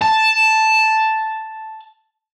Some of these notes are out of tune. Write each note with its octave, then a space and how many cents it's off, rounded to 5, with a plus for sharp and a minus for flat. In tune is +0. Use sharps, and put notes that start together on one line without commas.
A5 +0